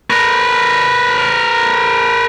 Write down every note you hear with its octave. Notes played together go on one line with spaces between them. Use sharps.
A#4 B4